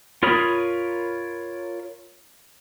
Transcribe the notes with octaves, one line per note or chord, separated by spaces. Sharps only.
F4 A#4 C#5 B5 D#6